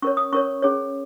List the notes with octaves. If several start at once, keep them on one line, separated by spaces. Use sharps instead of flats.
C#4 A#4 C#5 C#6
D#6
C#4 A#4 C#5 C#6
C#4 G#4 C#5